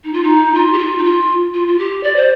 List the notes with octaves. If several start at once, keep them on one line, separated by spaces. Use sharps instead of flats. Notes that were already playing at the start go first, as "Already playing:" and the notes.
D#4
F4
D#4
F4
G4
F4
D#4
F4
F4
F4
G4
D5
C5